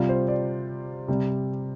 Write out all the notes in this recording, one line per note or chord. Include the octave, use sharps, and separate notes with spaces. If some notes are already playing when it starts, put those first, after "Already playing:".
Already playing: C3 G3 F4
C5
D5
C3 G3